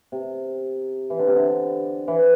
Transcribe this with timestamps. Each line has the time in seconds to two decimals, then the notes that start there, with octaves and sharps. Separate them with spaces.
0.12 C3
1.10 E3
1.19 D3
1.27 C3
1.36 D3
2.08 E3